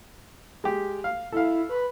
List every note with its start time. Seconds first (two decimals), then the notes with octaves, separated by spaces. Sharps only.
0.64 G#3 G4
1.04 F5
1.32 E4 A4 F5
1.69 B4